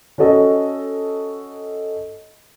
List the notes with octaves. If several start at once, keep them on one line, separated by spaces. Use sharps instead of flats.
C#4 F#4 A4 D#5